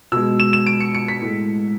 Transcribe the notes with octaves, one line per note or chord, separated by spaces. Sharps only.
B2 G#3 E6
E7
E7
D7
C#7
C#7
B6
A2 G#3